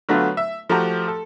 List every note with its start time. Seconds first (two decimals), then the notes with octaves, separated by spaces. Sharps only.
0.09 D3 F#3 A3 B3 F4
0.37 E5
0.69 F3 A3 F#4 G4 A#5
1.08 A4